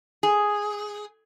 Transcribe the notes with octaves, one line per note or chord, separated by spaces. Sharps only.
G#4